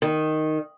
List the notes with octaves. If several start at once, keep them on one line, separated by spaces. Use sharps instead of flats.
D#3